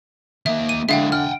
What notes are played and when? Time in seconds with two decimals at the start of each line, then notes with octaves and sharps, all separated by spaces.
0.46 D#3 A#3 E5
0.69 D#7
0.89 D3 G#3 E4 E5 F5 G5
1.12 F#5 G5 F6